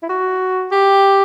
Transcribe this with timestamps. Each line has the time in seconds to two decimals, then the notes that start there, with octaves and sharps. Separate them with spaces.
0.03 E4
0.09 F#4
0.71 G4